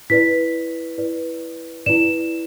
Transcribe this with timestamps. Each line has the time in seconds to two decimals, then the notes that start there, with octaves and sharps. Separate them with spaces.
0.10 E4 B4 D5 B6
0.98 E4 B4 D5
1.86 E4 B4 D5 E7